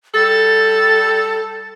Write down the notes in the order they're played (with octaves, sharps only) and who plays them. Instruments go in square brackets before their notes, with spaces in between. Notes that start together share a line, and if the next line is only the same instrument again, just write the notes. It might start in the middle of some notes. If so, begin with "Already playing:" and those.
[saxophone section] G3 A4 [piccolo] A6